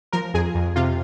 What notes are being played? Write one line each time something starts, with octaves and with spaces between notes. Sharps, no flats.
F3 A#4
F2 G#4
F2
C3 F4